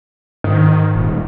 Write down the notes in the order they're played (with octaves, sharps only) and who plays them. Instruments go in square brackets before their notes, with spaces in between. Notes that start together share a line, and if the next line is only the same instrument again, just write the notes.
[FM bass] G#2 [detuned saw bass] D#3
[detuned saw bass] D#1